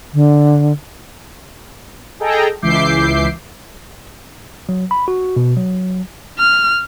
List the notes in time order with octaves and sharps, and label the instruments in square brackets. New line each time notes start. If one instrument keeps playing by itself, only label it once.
[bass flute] D3
[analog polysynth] G#4 A4 D#5 G5 A#5
C#2 E3 E5 D6 G6 C7
[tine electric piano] F#3
B5
F#4
B2
F#3
[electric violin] F6